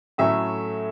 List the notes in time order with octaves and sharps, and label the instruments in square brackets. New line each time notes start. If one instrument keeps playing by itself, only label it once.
[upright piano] A2 F#3 A3 C#4 E5